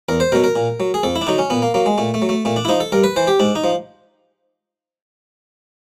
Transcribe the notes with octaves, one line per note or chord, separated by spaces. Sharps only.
E2 A#4
C5
B2 F#3 A#4
A#4
A#2
F#3
G#4
F2 A4
E4
D4
D3 F#3 D#4
C#4
A#2 B3
A#3
F#3 A#3
G#3
A#2 A3
A3
F#3
A3
A#2 A3
D4
E4
F3 D#4
A4
G2 A#4
B4
E3 C5
G4
G#2 D4
D#4
F3